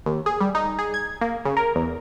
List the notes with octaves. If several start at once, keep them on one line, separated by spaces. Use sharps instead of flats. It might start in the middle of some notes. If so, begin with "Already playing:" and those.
D#2
G#4
G3
D#4
G#4
G#6
A#3
C#3
A#4
E2